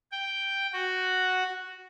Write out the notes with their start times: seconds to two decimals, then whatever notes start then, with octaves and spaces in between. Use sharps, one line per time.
0.12 G5
0.73 F#4